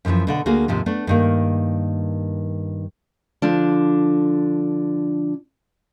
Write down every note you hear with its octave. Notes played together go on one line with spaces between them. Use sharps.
F#2 A2 D3 E3 F3
B2 D3 F#5
D2 A#3 F#4 G#4
D#2 G#2 C3 F3
A3 B3 D4
G2 D#3 A#3
D3 F3 D4